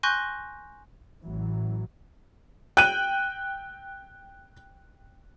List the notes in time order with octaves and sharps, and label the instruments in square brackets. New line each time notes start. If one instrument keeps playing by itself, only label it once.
[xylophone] G#5 C6 C#6 F#6 G6 A#6
[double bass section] A1 A2 E3 F#3
[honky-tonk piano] G5 [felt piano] F#6 D#7